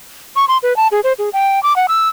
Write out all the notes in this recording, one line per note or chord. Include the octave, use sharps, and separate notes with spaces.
C#6
C6
B4
A5
G#4
C5
G#4
G5
D6
F#5
E6